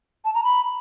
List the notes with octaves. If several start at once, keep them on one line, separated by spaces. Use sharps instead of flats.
A5
A#5
B5